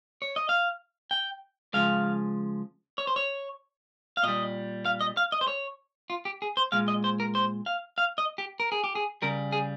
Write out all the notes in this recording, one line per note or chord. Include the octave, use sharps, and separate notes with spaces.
C#5
D#5
F5
G5
C#3 F3 G#3 F5
C#5
C5
C#5
F5
A#2 G3 D#5
F5
D#5
F5
D#5
C5
C#5
F4
G4
G#4
C5
A#2 G#3 F5
D#5
C5
A#4
C5
F5
F5
D#5
G4
A#4
G#4
G4
G#4
C#3 G3 A#4
G#4